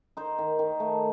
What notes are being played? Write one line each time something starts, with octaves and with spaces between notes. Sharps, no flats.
D#4 C5
D#3
D#3
A3